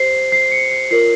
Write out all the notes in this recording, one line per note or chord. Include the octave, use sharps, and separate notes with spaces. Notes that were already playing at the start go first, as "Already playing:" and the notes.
Already playing: G4 C5 C7
C7
C#7
C7
F4 A#4 C#5 C7